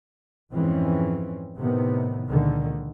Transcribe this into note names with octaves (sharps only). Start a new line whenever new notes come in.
F2 G#2 E3 F3 C4 C#4
A2 C3 D#3 B3
C#2 A#2 D3 D#3